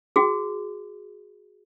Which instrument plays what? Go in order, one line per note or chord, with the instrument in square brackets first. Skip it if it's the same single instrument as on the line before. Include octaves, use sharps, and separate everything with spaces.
[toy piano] F#4 G#4